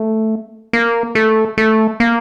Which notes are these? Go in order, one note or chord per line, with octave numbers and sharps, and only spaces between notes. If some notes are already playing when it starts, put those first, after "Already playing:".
Already playing: A3
A#3
A3
A3
A#3